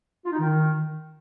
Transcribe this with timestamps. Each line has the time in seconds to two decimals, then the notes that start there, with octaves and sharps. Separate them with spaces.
0.25 F4
0.32 D#4
0.40 D#3